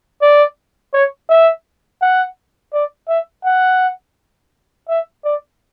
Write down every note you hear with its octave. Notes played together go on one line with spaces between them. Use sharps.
D5
C#5
E5
F#5
D5
E5
F#5
E5
D5